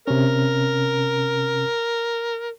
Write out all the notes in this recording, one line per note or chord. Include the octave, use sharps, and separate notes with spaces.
C3 C#4 A#4